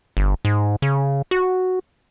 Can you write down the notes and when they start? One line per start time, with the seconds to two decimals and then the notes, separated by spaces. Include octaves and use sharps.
0.17 G1
0.45 G#2
0.82 C#3
1.31 F#4